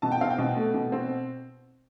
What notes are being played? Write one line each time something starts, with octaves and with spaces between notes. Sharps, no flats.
B2 A5
G5
C4 F5
G5
B2
A3
B2
C4